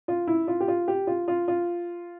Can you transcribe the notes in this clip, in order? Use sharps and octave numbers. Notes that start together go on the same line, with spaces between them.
F4
E4
F4
G4
F4
G4
F4
F4
F4